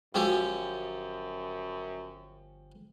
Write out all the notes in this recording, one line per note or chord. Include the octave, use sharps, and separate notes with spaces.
G1 F#2 F3 C#4 F#4 G4 G5